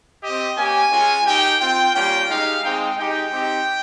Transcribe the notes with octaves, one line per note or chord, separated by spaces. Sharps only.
C4 G4 D#5
A#3 C#4 G4 G#5
G#3 C#4 F4
A#3 D#4 G4 G5
C4 F4 G5
G3 A#3 C#4 F4 G5
G#3 D#4 G4 F5
G#3 C4 D#4 G5
G#3 D#4 G4 G5
C4 D#4 G4